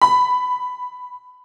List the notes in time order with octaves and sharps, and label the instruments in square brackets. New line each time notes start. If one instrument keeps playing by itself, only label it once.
[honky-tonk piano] B5